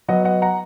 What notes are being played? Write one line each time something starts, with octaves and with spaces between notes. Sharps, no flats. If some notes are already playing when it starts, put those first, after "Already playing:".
F#3 B3 D#5 F#5
D#5 F#5
F#5 A#5